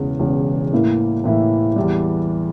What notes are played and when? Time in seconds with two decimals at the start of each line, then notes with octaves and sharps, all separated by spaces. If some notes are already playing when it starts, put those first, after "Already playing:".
Already playing: E1 E2 C#3
0.19 E1 E2 C#3
0.73 A2 E3 A#3 E4
1.24 A2 E3 A#3 E4
1.76 E2 E3 G3